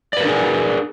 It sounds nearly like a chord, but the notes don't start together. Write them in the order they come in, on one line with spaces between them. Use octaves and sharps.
D5 B4 A#4 D4 G#4